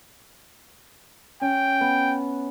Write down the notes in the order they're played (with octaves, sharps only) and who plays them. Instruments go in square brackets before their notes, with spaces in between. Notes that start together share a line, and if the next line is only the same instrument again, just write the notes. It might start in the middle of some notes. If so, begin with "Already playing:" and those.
[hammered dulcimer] C#4 [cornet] G5
[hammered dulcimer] B3